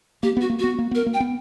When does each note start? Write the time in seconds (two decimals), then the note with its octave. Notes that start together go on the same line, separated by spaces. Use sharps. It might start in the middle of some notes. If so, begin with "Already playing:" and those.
0.23 A#3 G4
0.37 B3 F#4
0.50 A#3
0.59 B3 F#4
0.79 A#3
0.91 B3 A#4
1.06 A#3
1.14 G5
1.20 B3